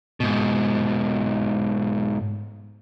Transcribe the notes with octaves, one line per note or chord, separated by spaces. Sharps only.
G#2 B2